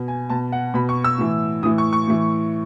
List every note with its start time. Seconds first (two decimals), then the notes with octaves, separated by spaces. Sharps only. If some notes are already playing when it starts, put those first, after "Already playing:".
Already playing: B2
0.08 G#5
0.30 B2 A5
0.52 F#5
0.74 B2 B5
0.89 C#6
1.04 E6
1.18 A2 E3
1.63 A2 E3 D#6
1.78 C#6
1.93 C#6
2.07 A2 E3